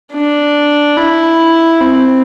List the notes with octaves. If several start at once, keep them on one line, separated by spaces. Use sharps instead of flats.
D4
E4
C4